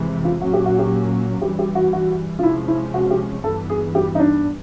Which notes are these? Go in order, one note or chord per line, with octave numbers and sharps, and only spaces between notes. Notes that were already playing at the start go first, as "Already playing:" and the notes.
Already playing: F2 C3 E3 G#3
F4
A#2 F#3 A#3 C#4 F#4
G4
F#4
G4
G2 E3 G3 G4
G4
F#4
F#4
F4
C3 F3 G#3 C#4 E4
E4
F#4
G4
G2 E3 G3 B3 A4
G#4
G4
D#4
D4